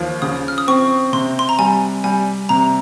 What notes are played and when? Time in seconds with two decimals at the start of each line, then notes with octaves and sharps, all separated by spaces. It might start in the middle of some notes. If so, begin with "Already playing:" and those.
Already playing: D#2 F3
0.22 C#3 D#6
0.48 F6
0.58 D#6
0.68 C4 C#6
1.13 C3 C6
1.39 C6
1.49 A#5
1.59 G3 G#5
2.04 G3 G#5
2.49 C3 A#5